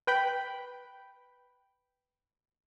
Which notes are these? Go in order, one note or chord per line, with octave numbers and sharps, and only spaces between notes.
B4 G5 B5